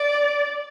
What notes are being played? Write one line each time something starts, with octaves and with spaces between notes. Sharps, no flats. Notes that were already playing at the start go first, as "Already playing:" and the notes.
Already playing: D5